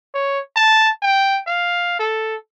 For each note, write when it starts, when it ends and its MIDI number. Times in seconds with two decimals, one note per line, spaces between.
0.14 0.40 73
0.56 0.89 81
1.02 1.40 79
1.47 1.97 77
1.99 2.36 69